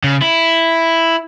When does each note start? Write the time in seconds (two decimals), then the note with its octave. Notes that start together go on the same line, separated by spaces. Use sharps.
0.03 C#3
0.22 E4